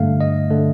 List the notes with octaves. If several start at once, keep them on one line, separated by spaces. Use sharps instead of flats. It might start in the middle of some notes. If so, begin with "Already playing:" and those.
Already playing: G2 D3 A3 F5
D#5
D3 A3